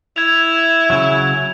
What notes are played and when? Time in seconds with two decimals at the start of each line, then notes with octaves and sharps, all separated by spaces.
0.16 E4 E5 G#6 F7
0.90 C#3 F#3